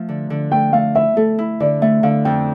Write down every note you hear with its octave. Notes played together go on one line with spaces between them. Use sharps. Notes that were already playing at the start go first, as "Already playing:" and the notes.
Already playing: F3 A3
D3
D3
A3 G5
A3 F5
E4 E5
A3 A4
E4
D3 D5
A3 E5
D3 F5
F2 G5